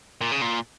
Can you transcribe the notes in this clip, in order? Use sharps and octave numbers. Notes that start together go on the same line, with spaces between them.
A#2
C#3
A#2